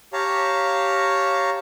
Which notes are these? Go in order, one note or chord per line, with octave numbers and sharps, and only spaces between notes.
G4 C#5 F5 A5 A#5